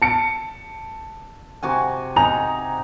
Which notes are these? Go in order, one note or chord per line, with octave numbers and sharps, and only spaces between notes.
A5 C#7 D7
C3 F#4 G#5
D#4 G#5 A#5 F7